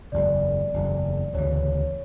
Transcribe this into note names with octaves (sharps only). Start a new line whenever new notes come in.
F#1 E2 C#3 D5
F#1 E2 C#3
D2 C#3 E3 C#5
C#5
C#5